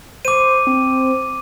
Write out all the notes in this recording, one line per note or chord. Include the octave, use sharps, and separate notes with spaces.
C5 D6 D#7
C4